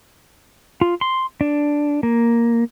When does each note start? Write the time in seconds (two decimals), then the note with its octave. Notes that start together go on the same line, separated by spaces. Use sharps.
0.81 F4
1.01 C6
1.41 D4
2.03 A#3